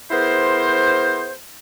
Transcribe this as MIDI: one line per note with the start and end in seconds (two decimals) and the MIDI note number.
0.11 1.32 59
0.11 1.32 64
0.11 1.32 68
0.11 1.32 70
0.11 1.32 72